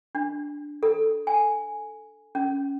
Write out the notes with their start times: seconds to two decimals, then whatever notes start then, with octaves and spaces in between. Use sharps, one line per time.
0.15 D4
0.83 A4
1.27 G#5
2.35 C#4